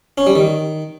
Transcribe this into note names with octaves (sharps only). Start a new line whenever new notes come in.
C#4
G3
D#3